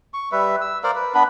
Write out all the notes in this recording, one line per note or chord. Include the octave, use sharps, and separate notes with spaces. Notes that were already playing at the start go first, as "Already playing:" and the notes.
C#6
G3 B4 E5
E6
A#4 C5 D5 F5
B4
B3 D4 B4 B5